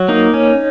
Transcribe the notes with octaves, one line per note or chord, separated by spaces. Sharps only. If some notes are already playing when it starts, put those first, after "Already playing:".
Already playing: F#3
A#3 D#4
C#4